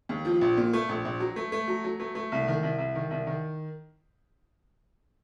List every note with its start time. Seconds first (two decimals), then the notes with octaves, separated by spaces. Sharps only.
0.09 D#2
0.25 F3
0.41 A#1
0.57 A#2
0.73 A3
0.89 A#1
1.05 A#1
1.20 F#3
1.36 A3
1.52 A3
1.68 F#3
1.84 F#3
2.00 A3
2.15 A3
2.32 C2
2.48 D#3
2.63 C2
2.78 C2
2.95 D#3
3.11 C2
3.27 D#3